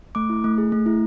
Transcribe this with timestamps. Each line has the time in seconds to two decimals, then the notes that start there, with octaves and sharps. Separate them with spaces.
0.15 A3 D6
0.30 E4
0.44 A3
0.58 G#4
0.72 A3
0.86 E4